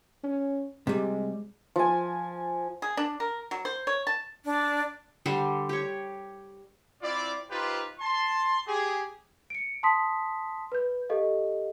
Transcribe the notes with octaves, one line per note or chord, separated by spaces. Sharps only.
C#4
C3 G3 G#3
F3 G#5
G#4
D4
A#4
F#3
C5
C#5
A5
D4
D3 G3 C5
G4 C#5
C4 E4 F4 D5
D#4 F4 G4 B4 C5
A5 C6
G4 G#4
C#7 D7
A5 C6 D#6 B6
B4 G6
G4 A4 D#5 F5